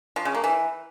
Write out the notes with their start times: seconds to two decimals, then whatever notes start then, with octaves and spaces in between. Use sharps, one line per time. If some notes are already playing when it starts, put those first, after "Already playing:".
0.16 F3
0.25 C#3
0.34 A#3
0.44 E3